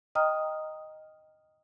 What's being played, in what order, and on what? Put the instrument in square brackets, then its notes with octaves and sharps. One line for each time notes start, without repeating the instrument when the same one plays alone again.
[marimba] D#5 G5 A#5 D#6 F6